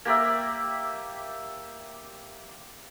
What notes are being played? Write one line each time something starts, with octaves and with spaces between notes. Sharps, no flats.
A#3 G4 D5 E5